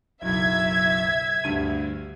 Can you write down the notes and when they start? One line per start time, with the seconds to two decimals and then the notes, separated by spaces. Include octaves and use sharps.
0.22 F#1 B1 E5 G#6
1.44 D2 G2 D#7